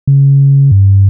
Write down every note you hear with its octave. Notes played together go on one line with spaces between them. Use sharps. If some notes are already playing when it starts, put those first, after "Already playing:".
C#3
G2